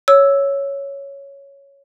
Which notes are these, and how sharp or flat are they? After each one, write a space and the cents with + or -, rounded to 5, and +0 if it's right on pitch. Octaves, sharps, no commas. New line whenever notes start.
C#5 +0 E6 +0